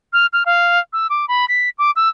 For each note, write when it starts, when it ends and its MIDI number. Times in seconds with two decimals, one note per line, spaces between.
0.13 0.26 89
0.33 0.43 89
0.46 0.79 77
0.93 1.07 88
1.10 1.26 86
1.28 1.45 83
1.48 1.69 95
1.78 1.91 86
1.96 2.09 88